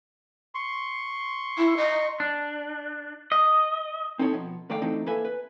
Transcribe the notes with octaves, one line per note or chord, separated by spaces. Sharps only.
C6 C#6
E4
D#5
D4
D#5
C4 D#4 E4 A4 A#4 C#5
B2 F3
D#2 D3 A3 D5 F5 G5
E3 A3 C4 D4 D#4
A#3 E4 A4 B4 E5 G#5
B4